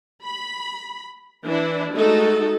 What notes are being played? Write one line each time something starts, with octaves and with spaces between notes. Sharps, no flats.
B5
E3 D4 E4
G#3 A3 D#4 F#4 A4